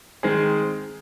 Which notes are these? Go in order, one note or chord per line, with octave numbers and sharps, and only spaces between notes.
D#3 G#3 C4 G#4